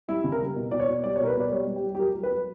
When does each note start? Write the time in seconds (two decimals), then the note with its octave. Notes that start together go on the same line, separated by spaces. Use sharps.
0.08 G3 E4
0.24 C#3
0.32 A#4
0.40 G3
0.56 B2
0.71 B2 D5
0.80 C#5
0.88 B2
1.04 G3 D5
1.16 C#5
1.20 B2 A#4
1.27 B4
1.36 B2 D5
1.51 G3 C#5
1.67 G3
1.76 G4
1.83 G3
1.95 G4
1.99 F#3 A#4
2.15 F#3
2.23 B4
2.31 F#3